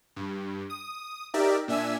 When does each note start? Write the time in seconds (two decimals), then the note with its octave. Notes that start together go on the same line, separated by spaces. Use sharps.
0.16 G2
0.70 D#6
1.34 D#4 G4 A#4 D5 E5
1.68 A#2 D4 E5 G#5 E6